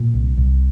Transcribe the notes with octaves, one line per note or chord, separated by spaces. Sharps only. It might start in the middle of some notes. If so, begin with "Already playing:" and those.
Already playing: A#2
C2
C2